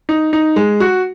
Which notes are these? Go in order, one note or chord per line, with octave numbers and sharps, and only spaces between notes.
D#4
D#4
G#3
F#4